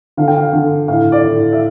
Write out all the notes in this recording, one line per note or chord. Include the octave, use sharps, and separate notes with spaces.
D3 F5
G5
F5
D3
A2 F5
D5
A2
E5